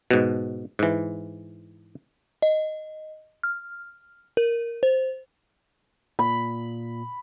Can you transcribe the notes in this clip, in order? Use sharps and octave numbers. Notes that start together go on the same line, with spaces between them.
G#2 B2
G#2 E3
D#5
F6
A#4
C5
A#2 B5